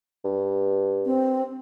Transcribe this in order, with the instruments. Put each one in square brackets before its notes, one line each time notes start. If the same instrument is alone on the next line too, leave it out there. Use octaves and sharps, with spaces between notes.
[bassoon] G2
[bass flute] C4